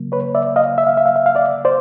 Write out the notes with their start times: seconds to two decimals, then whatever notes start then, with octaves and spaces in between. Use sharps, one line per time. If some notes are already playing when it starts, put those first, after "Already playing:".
Already playing: C#3 F#3 A#3
0.12 B4 C#5
0.35 D5 E5
0.56 D#5 F5
0.78 E5
0.87 F5
0.97 E5
1.06 F5
1.16 E5
1.26 F5
1.35 D5 E5
1.65 C5 D5